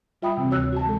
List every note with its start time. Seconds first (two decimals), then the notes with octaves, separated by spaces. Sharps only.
0.22 G3 F4 E5 G5 B5 D#6
0.37 C3 E3 C4
0.50 D2 F#4 C#5 E6 F#6
0.73 F#4 A5
0.84 E3 G#3 A4